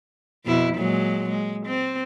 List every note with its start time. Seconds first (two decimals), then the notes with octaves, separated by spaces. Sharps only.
0.45 F2 B2 E4
0.76 A#2 F#3 G#3
1.30 G#3
1.66 C4